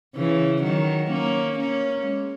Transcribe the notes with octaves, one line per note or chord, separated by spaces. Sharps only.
C#3 E3
D#3 F#3
A#3 C#4
A#3 C#4
G#3